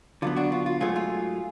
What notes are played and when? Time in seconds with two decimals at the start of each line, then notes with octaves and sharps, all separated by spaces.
0.22 D3 F#3 B3 F4
0.36 D4 F#4
0.52 F4
0.66 F4
0.80 G#2 F#3 A3 F4 G#4
0.96 F4 G#4